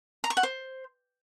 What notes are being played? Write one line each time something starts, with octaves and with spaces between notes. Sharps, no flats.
A#5
C#6
F#5
C5